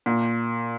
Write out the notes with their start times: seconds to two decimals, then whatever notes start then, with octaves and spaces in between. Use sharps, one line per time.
0.06 A#2